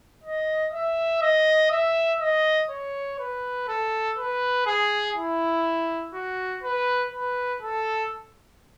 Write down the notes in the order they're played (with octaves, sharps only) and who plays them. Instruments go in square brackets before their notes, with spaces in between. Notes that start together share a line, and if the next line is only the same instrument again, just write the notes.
[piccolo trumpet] D#5
E5
D#5
E5
D#5
C#5
B4
A4
B4
G#4
E4
F#4
B4
B4
A4